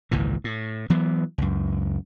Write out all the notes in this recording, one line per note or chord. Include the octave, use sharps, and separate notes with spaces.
G#1 C#2 A#2 E3
A2
E3 F#3 B3
C#2 F#2